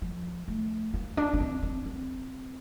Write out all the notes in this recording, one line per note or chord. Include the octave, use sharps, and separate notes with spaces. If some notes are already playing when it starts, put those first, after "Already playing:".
F3
A3
A#3
D4
D4
C4
C4
C4